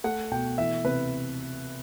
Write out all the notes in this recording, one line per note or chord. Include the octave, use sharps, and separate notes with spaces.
A3 F#5
B2 G5
E3 E5
C3 B4